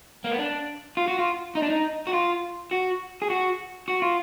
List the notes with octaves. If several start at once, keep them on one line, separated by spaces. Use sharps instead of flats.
A#3
B3
D4
F4
F#4
F4
D#4
D4
D#4
F#4
F4
F#4
G#4
F#4
F#4
F4